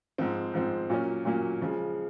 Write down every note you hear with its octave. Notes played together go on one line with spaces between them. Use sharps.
G#2 F3 C4
G#2 F3 C4
A#2 F#3 A#3 C#4
A#2 F#3 A#3 C#4
C#3 F3 G#3